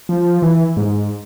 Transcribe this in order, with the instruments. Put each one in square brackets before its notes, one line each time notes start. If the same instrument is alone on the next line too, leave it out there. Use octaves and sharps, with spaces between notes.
[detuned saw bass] F3
E3
G#2